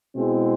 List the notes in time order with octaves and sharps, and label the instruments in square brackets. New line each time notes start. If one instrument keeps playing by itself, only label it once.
[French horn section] B2 G#3 C4 E4